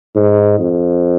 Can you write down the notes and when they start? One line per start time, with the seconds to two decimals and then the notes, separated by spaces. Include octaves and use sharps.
0.16 G#2
0.59 F2